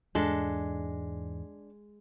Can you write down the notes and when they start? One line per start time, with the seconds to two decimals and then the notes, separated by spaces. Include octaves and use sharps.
0.15 E2 G#2 G#3 D4 A4